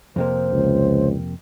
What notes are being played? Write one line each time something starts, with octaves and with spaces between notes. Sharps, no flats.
F2 C3 A#3 C5
C#2